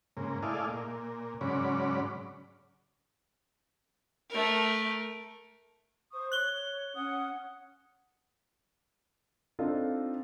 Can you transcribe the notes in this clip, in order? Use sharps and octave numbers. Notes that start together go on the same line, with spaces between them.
G#2 C#3 A#3
A3 E4 G#4 D5 D#5 F5
A#2
G#2 C#3 F#3 C#4 D5 B5
A3 A#4
C5 C#6 D#6
C#5 F#6 G7
C#4 F#5 D#6
C4 D4 D#4 F4 A4